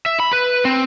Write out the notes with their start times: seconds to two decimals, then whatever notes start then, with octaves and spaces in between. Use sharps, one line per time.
0.06 E5
0.20 B5
0.33 B4
0.65 C4